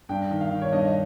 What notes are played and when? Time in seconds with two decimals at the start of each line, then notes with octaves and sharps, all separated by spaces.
0.09 G2 G5
0.31 D#3
0.41 F5
0.51 D#3
0.61 C#5
0.72 G2 D#5
0.88 D#5